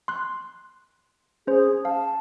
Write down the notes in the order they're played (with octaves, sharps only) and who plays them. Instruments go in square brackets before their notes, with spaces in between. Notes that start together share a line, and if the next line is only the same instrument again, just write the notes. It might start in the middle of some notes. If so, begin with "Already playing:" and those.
[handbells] C6 F#6
[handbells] C#4 C5 [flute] G#4
[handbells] F5 [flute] A5